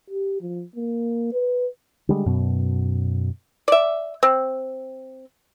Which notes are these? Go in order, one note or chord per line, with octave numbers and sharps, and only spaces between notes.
G4
F3
A#3
B4
D3 G3 G#3
F#2 B2
D5 E5
C4